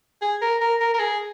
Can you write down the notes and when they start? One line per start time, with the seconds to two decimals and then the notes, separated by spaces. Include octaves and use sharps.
0.22 G#4
0.41 A#4
0.61 A#4
0.80 A#4
0.94 A#4
0.99 G#4